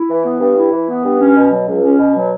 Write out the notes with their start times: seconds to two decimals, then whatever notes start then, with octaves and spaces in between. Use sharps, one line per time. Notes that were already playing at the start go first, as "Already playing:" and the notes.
Already playing: E4
0.09 E3
0.25 B3
0.40 G2
0.57 E4
0.72 E3
0.88 B3
1.04 G2
1.20 C#4
1.36 B2
1.52 F#3
1.68 C#2
1.84 C#4
1.99 B2
2.15 F#3